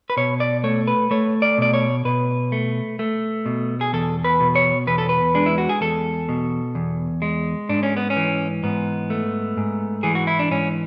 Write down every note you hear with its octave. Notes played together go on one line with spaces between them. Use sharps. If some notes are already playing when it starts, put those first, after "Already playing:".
B4
B2 C#5
D5
A3 C#5
B4
A3 C#5
D5
B2 D5
C#5
B2 B4
A3
A3
B2
G#4
E2 A4
B4
B2
C#5
E2 B4
A4
B4
G#3 D4
E4
F#4
G#4
E2 A4
B2
E2
G#3
G#2 D4
C#4
B3
C#4
E3
G#2 B3
A3
G#2
E3 G#4
F#4
E4
D4
G#2 C#4